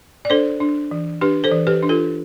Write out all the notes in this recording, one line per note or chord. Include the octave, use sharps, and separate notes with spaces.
D5
D4 A4 C5
D4
E3
D4 G4 B4
A4 C5
E3
G4 B4
D4
F4 A4